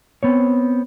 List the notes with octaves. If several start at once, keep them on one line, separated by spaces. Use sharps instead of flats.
B3 C4 C#5